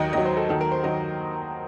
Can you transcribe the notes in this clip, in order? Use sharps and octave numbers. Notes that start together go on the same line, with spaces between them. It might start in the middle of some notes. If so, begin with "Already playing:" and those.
Already playing: D#2 D#3 F#3 D#5
D#2 D#3 F#3 D#5
C5
A4
D#2 D#3 F#3 A4
A#4
C5
D#3 F#3 D#5